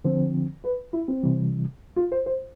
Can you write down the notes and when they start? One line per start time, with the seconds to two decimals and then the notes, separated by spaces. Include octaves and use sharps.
0.04 D3 F3 C4 C5
0.64 B4
0.93 E4
1.08 C4
1.23 C3 E3 G3
1.96 F4
2.12 C5
2.26 C5